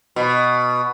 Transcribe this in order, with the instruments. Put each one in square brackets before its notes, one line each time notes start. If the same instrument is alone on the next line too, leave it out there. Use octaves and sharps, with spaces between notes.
[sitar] B2